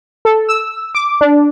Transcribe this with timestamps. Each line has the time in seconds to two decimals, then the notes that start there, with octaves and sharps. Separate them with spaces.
0.25 A4
0.49 E6
0.95 D6
1.21 D4